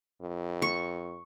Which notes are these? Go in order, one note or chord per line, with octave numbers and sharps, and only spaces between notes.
F2
C#6